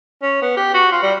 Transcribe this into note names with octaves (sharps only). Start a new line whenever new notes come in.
C#4
B3
G4
F#4
F4
G3